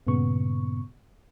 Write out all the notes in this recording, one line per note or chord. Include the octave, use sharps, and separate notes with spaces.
G2 A#2 C#3 B3 C#6